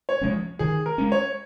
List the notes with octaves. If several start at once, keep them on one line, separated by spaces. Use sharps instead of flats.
C#5
F3 G#3 C#4
D#3 G#4
A#4
G#3 C#4
C#5